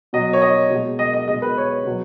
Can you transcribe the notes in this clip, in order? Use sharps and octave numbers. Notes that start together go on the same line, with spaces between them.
B2 F#3 D#5
C#5
D#5
B2 G#3
D#5
D#5
B2 G#3 D#5
B4
C#5
B2 F#3